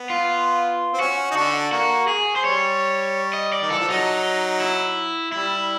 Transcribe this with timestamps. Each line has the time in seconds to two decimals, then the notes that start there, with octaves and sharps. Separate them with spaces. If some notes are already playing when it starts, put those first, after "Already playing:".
Already playing: B3
0.10 F4
0.94 C4
1.00 C#4 F#4
1.31 D#4
1.35 D3 D4 F#4
1.72 A#3 F#4
2.08 G#4
2.36 C5
2.44 G3 C#5
3.33 D#5
3.52 D5
3.62 D#3
3.70 E3 A4
3.79 F3
3.89 F#3 D#4
4.60 E4
5.32 G3 E4